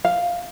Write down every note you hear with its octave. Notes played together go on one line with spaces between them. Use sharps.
F5